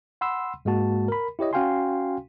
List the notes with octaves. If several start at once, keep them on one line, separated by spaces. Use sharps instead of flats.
F#5 B5 C6 E6
G#2 G#3 A#3 F#4 A5
A#4 B5
E4 G4 C#5 D#5
C#4 F#4 F5 G5 G#5 C6